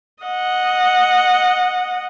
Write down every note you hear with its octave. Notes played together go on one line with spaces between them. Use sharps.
D#5 F#5